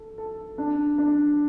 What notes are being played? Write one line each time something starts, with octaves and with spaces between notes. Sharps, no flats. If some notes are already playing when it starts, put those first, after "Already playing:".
Already playing: A4
A4
D4
D4